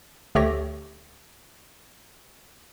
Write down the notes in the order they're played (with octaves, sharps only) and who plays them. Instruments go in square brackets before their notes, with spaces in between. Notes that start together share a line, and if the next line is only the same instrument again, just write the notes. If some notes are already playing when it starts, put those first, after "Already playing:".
[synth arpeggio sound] D2 A3 G4 C#5 A#6